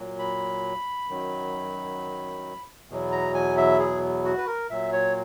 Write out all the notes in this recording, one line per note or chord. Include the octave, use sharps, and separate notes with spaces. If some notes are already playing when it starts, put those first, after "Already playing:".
Already playing: A#2 F#3
B5
F#2 D#3 F#3
E2 B2 F#3
A#5
G#5
E5
G#4
F#4
B4
A#4
A#2 F#3 E5
C#5